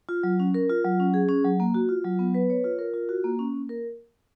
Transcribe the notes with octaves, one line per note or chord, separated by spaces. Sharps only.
F4
F#3
C#4
A#4
F4
F#3
C#4
G#4
C#4
F#3
A#3
F#4
F4
F#3
B3
B4
C#5
F4
A#4
F4
F#4
A#3
C#4
A#3
A#4